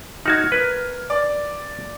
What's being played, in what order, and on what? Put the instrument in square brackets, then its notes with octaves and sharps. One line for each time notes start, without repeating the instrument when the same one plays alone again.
[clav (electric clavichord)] D#4 F#4 [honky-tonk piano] F6 G#6
[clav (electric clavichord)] A#4 B4
[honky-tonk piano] D5